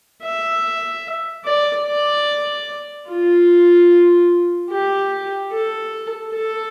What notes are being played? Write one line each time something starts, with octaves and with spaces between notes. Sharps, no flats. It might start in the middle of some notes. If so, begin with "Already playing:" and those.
E5
D5
D5
F4
G4
A4
A4